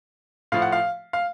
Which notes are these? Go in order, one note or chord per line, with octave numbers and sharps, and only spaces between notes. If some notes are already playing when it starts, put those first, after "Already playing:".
A2 F3 F5
F#5
F5
F5